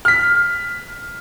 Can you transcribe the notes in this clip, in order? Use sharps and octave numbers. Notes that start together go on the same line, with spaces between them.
F6 B6